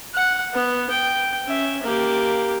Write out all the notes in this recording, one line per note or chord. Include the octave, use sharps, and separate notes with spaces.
F#5
B3
G5
C#4 E5
A#3 G4